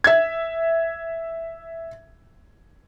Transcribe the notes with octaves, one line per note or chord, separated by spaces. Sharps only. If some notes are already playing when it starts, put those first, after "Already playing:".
E5 G#6